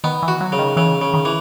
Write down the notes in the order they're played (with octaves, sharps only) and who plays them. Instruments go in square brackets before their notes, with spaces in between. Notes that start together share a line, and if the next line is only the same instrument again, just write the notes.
[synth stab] D#3 [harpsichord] B3
[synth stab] E3
[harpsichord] F#4
[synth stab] F#3
[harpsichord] C#3
[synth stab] D#3
[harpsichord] C#3 [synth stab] E3
[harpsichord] C#3
[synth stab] D#3
[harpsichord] E3